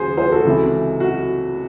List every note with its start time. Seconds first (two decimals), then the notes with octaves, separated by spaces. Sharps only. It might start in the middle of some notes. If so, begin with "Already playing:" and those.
Already playing: D#2 C#3 F#4 G#4 C5
0.17 G#4 C5
0.32 F#4 A4
0.45 C#2 C3 E3
1.00 F#4